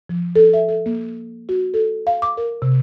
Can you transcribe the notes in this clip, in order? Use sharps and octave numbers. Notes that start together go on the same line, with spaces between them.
F3
A4
E5
A4
A#3
F#4
A4
F5
D6
A#4
C3